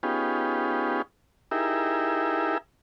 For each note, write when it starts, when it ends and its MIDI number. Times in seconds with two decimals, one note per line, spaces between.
0.03 1.02 59
0.03 1.02 61
0.03 1.02 63
0.03 1.02 65
0.03 1.02 67
0.03 1.02 68
1.51 2.58 63
1.51 2.58 64
1.51 2.58 67
1.51 2.58 68
1.51 2.58 70
1.51 2.58 76